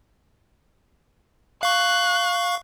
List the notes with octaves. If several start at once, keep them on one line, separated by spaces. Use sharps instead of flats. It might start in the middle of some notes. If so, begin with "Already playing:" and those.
F5 C#6 F#6